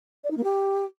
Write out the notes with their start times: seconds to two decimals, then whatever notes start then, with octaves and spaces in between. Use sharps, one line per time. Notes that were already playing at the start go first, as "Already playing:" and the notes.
0.23 D5
0.30 D#4
0.37 A#3
0.43 G4